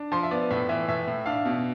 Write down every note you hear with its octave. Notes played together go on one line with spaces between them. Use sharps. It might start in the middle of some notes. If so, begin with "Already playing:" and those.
Already playing: D4
F3 C6
E5
B3 D5
A2 E5
E3 E5
A2 E5
A2
D4 F5
B2